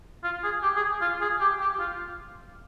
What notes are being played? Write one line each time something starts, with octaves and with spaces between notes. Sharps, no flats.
F4
G#4
G4
G#4
F4
G#4
G4
G4
F4